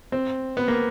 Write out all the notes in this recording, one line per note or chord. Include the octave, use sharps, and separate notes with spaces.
C4
B3
A#3